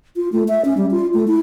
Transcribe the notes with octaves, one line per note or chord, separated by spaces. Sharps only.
F4
A3
E5
C#4
G3
F4
A3
E4